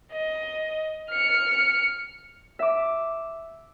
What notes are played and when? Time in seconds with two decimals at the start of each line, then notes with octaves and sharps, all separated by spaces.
0.12 D#5
1.10 F6 C#7
2.59 E5 D6